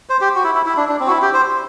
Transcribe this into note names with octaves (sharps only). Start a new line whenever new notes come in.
C5
G4
F#4
E4
E4
E4
D4
D4
C4
F#4
E4
G4
C5